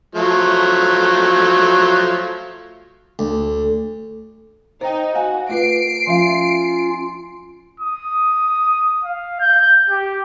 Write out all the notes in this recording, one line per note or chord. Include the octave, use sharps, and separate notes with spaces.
F3 F#3 A3
D2
D#4 C5 G5
F#4 F5 G#5
A3 F4 B4 C7 D7
F3 C#4 F4 E5 F5
D#6
F5
G6
G4